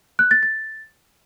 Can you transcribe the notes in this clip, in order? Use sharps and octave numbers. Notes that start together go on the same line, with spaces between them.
F#6
A6
A6